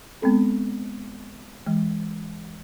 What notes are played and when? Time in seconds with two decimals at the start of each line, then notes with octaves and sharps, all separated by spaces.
0.22 G#3 B3 C4 A4
1.67 E3 G#3